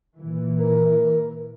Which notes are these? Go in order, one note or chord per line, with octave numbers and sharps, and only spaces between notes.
A#2 E3
A#4